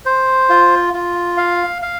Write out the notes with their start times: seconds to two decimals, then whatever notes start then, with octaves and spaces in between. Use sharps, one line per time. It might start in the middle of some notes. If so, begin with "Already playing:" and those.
0.06 C5
0.49 F4
0.94 F4
1.37 F5
1.82 F5